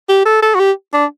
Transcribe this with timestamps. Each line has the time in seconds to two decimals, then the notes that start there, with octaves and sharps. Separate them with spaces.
0.09 G4
0.25 A4
0.42 A4
0.55 F#4
0.59 G4
0.93 D4